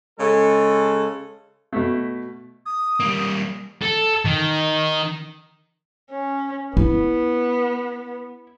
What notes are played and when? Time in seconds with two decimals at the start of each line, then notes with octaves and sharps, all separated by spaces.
0.20 C#3 G#3 A4
1.73 B2 A3
2.66 D#6
3.00 G3 A#3
3.82 A4
4.25 D#3
6.11 C#4
6.77 B3 E4